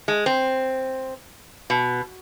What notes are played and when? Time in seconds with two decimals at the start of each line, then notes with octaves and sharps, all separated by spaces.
0.08 G#3
0.26 C4
1.70 B2